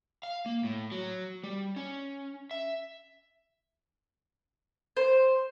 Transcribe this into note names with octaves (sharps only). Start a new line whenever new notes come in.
F5
A#3
A2
F#3
G3
C#4
E5
C5